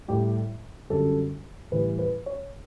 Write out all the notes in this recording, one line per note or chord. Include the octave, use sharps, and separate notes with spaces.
A2 G3 G4
F#2 D3 G3 A4
A2 E3 G3 B4
B4
C#5